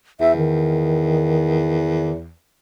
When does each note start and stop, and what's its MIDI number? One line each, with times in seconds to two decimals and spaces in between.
0.20 2.33 40
0.20 0.35 76
0.37 2.11 51